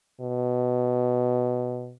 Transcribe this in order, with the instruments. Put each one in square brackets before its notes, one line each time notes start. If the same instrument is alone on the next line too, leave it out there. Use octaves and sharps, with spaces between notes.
[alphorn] B2